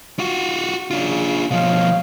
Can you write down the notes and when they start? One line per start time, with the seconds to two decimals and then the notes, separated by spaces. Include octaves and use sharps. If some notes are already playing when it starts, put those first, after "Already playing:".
0.19 F4 F#4
0.91 C#3 D4 F4
1.51 B2 F3 C#5 D#5 F5